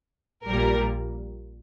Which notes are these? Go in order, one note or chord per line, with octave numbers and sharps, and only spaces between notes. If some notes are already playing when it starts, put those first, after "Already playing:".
A#1 A#2 G3 A#4